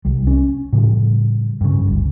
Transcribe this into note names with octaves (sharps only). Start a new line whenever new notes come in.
C2 G3
C#4
A2 C#3 F3 G3
G2 C#3
G1 C#2